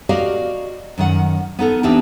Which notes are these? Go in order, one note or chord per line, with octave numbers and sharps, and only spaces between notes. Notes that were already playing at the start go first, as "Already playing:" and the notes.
F#4 G4 A#4 D5 D#5 F5
F#2 D#3 F#5
B3 D#4 A4 A#4
E2 C4 D4 D#4 G4 E5